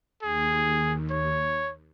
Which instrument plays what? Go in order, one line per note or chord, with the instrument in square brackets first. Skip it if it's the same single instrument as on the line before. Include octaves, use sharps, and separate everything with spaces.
[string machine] D#2 [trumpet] G#4
[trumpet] C#5